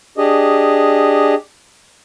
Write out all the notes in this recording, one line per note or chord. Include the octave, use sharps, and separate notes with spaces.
D4 G4 G#4 D#5